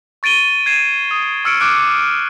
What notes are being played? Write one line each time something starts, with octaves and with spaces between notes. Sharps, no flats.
C#6 A6 D7 D#7 G7
G#6 C7 D#7 E7
D#6
C#6 E6 F6 C#7 D7
D6 F6 F#6 D7